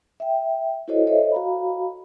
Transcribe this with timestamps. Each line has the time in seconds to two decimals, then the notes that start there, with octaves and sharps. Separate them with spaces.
0.20 E5 G5
0.88 E4 F#4 A4 C5 C#5 D#5
1.07 A4 C5 C#5 D#5 E5
1.32 F#4 F5 A#5 B5